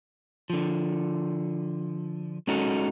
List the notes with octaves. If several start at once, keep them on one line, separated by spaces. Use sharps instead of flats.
D3 F3
G#3 C#4 D#4 F#4 A4